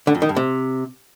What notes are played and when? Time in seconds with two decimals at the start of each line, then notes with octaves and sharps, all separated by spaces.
0.07 D3
0.15 F2
0.22 D#3
0.29 G2
0.36 C3